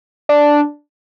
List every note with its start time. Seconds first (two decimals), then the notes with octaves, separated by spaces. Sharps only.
0.29 D4